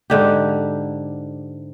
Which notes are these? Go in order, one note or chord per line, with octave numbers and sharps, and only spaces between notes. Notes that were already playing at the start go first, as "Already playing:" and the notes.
G#2 D3 G4